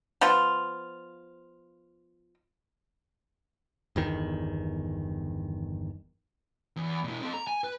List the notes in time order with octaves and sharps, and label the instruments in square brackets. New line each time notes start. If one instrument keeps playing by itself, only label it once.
[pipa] F3 B3 F4
[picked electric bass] G1 E2 D#3
[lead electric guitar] E2
B2 E4
C4 A4
A#5
G#5
B4